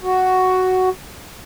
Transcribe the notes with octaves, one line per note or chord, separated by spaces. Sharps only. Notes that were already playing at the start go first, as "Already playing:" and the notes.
F#4